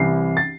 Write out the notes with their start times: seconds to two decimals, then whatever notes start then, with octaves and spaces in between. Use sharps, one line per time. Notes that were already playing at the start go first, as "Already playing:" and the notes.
Already playing: C2 C3 E3 C7
0.37 A6